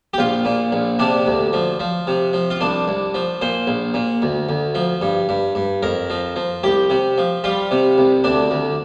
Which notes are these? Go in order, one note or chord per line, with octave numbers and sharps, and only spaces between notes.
G4
A#1 F4
A#2
A#1
C3 D4
D2
F3
F3
C3
F3
F4
C2 D4
C2
F3
A#2 C5
A#1
A#2
D2
D2
F3
G2
G2
G2
F2 A#4
F3
F3
C2 G4
C3
F3
G3 F4
C3
C2
D2 D4
D2